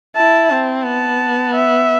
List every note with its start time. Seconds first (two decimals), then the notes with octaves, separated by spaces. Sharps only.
0.16 E4 A5
0.51 C4
0.84 B3 A5
1.55 E5